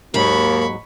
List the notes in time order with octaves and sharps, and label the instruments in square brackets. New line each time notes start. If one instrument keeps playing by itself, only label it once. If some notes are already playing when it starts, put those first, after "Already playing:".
[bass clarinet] D#2 [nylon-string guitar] G#2 F#3 D#4 [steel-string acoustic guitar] A#3 [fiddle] B5 C#6